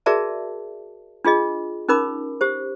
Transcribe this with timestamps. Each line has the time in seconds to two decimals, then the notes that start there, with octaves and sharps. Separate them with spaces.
0.06 F#4 G#4 A#4 D5 E5 A5
1.25 D4 F4 G#4 D#5
1.89 C#4 D#4 A#4 B5 D6
2.41 G4 C5